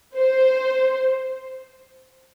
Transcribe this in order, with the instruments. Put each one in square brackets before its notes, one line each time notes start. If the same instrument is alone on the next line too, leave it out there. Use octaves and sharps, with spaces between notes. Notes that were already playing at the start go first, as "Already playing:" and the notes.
[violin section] C5